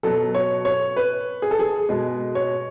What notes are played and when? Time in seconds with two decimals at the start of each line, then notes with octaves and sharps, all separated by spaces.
0.03 B2 F#3 A4
0.35 C#5
0.65 C#5
0.97 B4
1.42 G#4
1.51 A4
1.59 G#4
1.89 B2 G#3
2.35 C#5